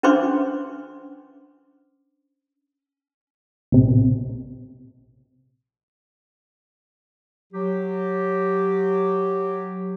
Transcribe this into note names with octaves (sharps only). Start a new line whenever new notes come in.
C#4 D4 B4 C5 C6 D6
A#1 C3
F#3 G4